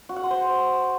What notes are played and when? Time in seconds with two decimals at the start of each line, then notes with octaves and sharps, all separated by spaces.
0.09 F#4
0.16 F#5
0.23 C6
0.31 C5